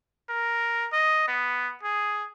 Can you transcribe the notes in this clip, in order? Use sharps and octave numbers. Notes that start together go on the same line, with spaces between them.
A#4
D#5
B3
G#4